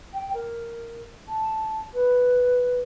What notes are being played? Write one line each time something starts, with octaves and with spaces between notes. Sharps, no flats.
G5
A#4
A5
B4